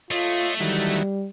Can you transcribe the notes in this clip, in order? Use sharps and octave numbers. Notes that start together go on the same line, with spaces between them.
A3 F4 C#5 D#5 C6
D#3 E3 F#3 G3